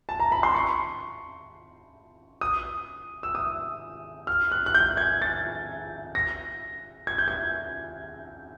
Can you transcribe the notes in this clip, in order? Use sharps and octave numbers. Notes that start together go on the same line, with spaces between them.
A5
A#5
B5
C6
C#6
D#6
E6
D#6
F6
F#6
F#6
G6
G#6
A6
A#6
G#6
G6
G#6